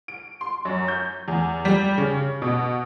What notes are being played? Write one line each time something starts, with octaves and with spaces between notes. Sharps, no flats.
D7
C6
F#2
G6
E2
G3
C#3
B2